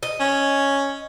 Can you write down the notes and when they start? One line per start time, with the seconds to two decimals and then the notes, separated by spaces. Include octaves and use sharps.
0.03 D#5
0.20 C#4